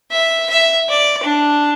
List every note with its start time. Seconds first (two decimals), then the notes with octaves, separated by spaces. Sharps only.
0.11 E5
0.50 E5
0.89 D5
1.24 D4